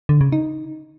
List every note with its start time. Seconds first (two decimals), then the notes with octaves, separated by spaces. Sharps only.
0.09 D3
0.21 C#3
0.32 D#4